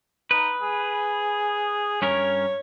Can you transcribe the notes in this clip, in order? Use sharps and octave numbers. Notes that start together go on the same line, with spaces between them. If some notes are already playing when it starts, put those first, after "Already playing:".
D#4 B4
G#4
G2 C#4 A#4 C#5